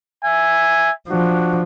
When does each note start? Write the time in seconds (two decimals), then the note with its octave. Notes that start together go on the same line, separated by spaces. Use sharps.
0.23 E5 G#5
1.09 F3 D4 F#4